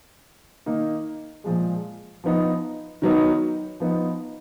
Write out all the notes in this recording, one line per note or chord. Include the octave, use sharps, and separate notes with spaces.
D#3 A#3 D#4
A#2 F3 G#3
F3 B3 D#4
D#3 F#3 B3 D#4
F3 B3 D#4